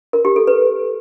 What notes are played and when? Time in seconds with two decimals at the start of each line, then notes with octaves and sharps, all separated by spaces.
0.13 A#4
0.25 G4
0.36 A4
0.47 B4